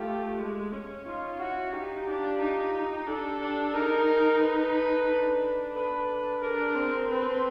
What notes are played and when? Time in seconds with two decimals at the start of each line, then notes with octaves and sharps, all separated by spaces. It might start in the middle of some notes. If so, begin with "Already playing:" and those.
Already playing: A3 F4 G4
0.39 G#3
0.73 C#4
1.05 D#4 F4
1.39 E4 F#4
1.73 D#4 F4 G4
2.07 D4
2.41 D#4
3.07 D4 G4 A4
3.40 D4
3.73 D#4 G#4 A#4
4.40 A4 B4
5.08 D4
5.75 A4 B4
6.42 D4 G#4 A#4
6.75 C4
7.09 C4 A4 B4